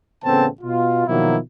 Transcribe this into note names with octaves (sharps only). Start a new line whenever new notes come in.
A1 C#3 B3 C4 A4 A5
B2 F4
B2 D#3 F3 F#3 A#3 E4